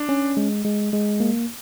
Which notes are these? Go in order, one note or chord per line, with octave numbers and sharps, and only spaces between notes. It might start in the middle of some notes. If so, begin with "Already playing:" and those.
Already playing: D4
C#4
G#3
G#3
G#3
A#3